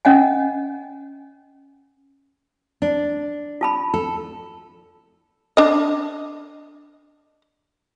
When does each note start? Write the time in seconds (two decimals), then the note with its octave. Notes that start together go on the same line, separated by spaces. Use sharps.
0.05 C#4 D#5 F#5 G#5
2.82 D4
3.61 F4 A5 B5
3.94 A4
5.57 D4 D#5